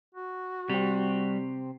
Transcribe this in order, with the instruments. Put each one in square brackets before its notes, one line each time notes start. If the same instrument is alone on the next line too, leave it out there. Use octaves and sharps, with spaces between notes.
[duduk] F#4
[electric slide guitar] C3 C4 [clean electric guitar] G3